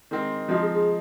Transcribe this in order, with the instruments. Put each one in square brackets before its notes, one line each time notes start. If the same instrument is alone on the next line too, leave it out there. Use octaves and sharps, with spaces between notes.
[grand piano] D#3 G#3 C4
[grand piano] F3 G#3 C4 D#4 [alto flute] F#4
[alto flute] G#4
G#4